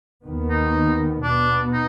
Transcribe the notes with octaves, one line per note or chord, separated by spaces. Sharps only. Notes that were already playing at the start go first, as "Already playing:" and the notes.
D#2 D#3 B3
D#4
B2 B3 D4
D#4